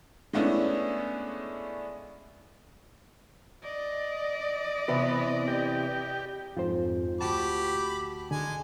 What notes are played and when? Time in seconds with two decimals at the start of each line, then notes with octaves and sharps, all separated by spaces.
0.33 G#3 A3 B3 C#4 D4 E4
3.63 D5 D#5
4.88 C3 E3 B3 B4
5.48 G4
6.57 F2 G#2 F4 C5
7.21 D2 F#4 G4 A5 B5 D6
8.31 D3 G#3 G#5